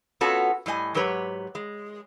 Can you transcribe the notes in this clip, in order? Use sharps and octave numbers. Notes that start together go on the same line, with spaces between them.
B3 C#4 F4 F#4 A4
A2 G3 D#5 G#5
G#2 F#3 G4 B4 C#5
G#3